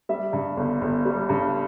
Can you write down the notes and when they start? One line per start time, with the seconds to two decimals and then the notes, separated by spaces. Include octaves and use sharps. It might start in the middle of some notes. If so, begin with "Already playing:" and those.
0.09 G3 E5
0.33 G2
0.57 G1
0.81 G1
1.05 G3
1.29 G2